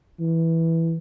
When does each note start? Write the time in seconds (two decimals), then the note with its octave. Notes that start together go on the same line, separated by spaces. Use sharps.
0.20 E3